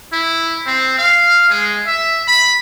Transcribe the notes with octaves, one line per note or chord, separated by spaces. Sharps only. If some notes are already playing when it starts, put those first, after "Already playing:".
E4
C4
F5
G#3
E5
B5